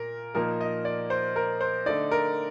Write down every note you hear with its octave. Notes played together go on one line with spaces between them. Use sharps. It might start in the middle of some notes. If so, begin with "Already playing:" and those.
Already playing: A#2 A#4
A#2 F3 A#3 D#4 A#4
D#5
D5
C5
A#4
C5
D3 A3 D#4 D5
A#4